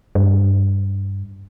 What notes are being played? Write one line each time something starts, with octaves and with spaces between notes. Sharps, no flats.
G2